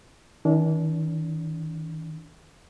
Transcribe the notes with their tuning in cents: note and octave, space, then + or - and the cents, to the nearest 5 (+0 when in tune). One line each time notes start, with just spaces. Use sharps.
D#3 +45 D4 -35